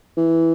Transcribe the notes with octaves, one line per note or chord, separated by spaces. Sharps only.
E3